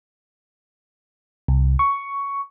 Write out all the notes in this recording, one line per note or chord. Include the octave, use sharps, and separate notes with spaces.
C2
C#6